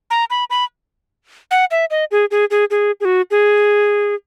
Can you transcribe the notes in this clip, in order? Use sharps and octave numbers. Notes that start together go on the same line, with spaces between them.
A#5
B5
B5
F#5
E5
D#5
G#4
G#4
G#4
G#4
G#4
F#4
G#4